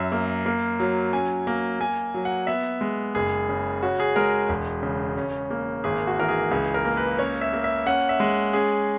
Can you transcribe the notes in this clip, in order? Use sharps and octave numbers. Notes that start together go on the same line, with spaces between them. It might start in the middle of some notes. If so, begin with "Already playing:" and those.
Already playing: F#2 E5
A#3
A#3
F#3
C#4 G#5
A#3
A#3 G#5
F#3
F#5
B3 E5
G#3
F#1 G#4
C#3
C#4 F#4
G#4
G#3 A#4
E1
C#3
C#4
A#3
G#1 G#4
F#4
E3 A#4
G#4
C#2 G#4
A#4
A#3
B4
C#4 C#5
E5
A#3
E5
C#4 F#5
E5
G#3
C#4 G#4